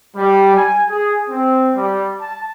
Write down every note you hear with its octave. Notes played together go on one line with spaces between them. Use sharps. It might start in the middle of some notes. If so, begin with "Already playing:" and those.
G3
G#5
G#4
C4
G3
A5